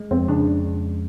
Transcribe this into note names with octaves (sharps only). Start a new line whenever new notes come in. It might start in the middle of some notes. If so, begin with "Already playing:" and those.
Already playing: G#3
F2 C4
C#3 D4